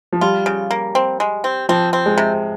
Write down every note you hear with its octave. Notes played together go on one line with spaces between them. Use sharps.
F3
G3 F4
C#3
A#3
C4
G#3
C4
F3 C4
C4
G#3
C3